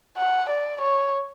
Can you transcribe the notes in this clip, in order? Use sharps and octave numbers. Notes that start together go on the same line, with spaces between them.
F#5
D5
C#5